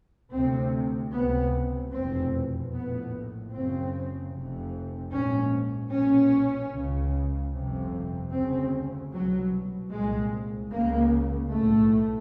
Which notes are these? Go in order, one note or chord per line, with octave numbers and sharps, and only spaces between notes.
D2 C3 C4
C#2 C3 B3
F1 E2 B2 C4
A#1 A2 B3
F#1 F#2 C#3 C4
F1 F2 C3
A#1 G#2 C#4
B1 A#2 C#4
C#2 C#3
G1 F2 C3
D2 C#3 C4
C2 B2 F#3
C2 A#2 G#3
C#2 C#3 A#3
B1 A2 A3